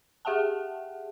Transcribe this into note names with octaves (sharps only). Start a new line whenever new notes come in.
G4 G#4 E5 F#5 G5 A5